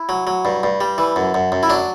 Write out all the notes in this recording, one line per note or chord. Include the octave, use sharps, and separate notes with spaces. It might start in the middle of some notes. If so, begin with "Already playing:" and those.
Already playing: E4
F#3
F#3
G2
G2
G3
E3
F#2
F#2
F#2
E4
F#3 D4